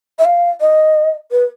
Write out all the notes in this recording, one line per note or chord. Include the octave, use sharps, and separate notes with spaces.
E5
F5
D#5
B4